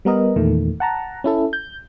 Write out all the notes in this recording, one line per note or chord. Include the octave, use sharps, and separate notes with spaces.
G3 B3 A#4 D#5
E2 A#2 D#3 A3
F#5 A5 A#5
C#4 E4 A4
G6